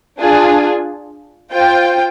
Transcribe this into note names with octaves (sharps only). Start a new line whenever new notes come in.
D4 F4 G#4
F4 C5 G5